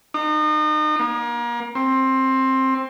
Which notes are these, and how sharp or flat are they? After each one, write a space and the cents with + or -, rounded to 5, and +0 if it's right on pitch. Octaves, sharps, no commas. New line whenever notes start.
D#4 -35
A#3 +35
C4 +15